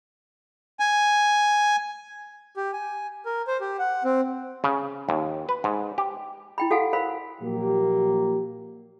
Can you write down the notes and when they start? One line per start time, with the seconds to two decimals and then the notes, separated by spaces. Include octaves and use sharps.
0.80 G#5
2.57 G4
2.73 G#5
3.26 A#4
3.48 C5
3.61 G4
3.79 F#5
4.04 C4
4.64 C#3
5.09 D#2
5.49 B4
5.64 G#2
5.98 G4
6.58 E4 G5 B5
6.71 F#4 G4 A4 F5 F#5 G#5
6.93 A#4 C5 F5 B5
7.42 A#2 F3 F#3 A#3 G4